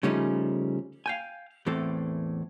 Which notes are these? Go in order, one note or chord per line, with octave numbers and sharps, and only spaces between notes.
C#3 F3 G3 A3 C#4 D#4
F5 G5 G#5
E2 A2 E3 C4 A4